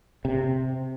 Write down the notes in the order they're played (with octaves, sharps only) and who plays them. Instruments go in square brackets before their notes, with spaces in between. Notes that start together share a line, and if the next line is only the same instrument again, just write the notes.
[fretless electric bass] C3